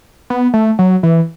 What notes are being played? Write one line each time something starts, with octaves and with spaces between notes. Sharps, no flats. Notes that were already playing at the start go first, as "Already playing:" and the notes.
B3
A3
F#3
E3